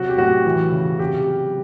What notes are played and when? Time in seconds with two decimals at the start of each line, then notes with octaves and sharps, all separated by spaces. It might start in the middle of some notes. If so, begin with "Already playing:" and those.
Already playing: C3 F#3 F#4
0.09 G4
0.18 A2 F#4
0.46 E3
0.72 C#3
0.99 C3 G4
1.27 F#3